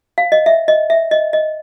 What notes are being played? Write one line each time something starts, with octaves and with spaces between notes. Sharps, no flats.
F5
D#5
E5
D#5
E5
D#5
D#5